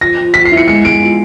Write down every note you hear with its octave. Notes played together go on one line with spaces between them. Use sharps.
F3 A#6
F3
F3 B6
C7
E4
C#7
G#3 C#7
G#3 D7
F4